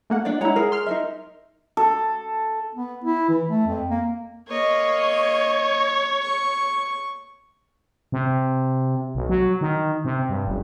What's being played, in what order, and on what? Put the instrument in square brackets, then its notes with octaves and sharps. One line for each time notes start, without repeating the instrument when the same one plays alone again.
[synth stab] A3 A#3 F#5
[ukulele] D4 D5
[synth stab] G#3 E4 [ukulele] C#5 F#5 A#5
[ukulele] G#4 [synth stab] A#4
[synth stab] C6 F6
[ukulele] D#4 A#4 E5
[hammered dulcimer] A4
[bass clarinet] B3
E4
E3
A3
F2
A#3
[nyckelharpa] A#3 D#5 [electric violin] C#5
[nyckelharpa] C#6
[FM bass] C3
B1
F#3
D#3
C3
G2
F#1